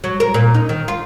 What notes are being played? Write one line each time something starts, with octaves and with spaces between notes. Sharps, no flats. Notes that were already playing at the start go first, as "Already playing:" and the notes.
F#3
A#4
A#2
D#4
D#3
F4